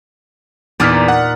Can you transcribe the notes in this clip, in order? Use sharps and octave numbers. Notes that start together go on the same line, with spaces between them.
E2 A#2 D#4 D5 F6 B6
F#5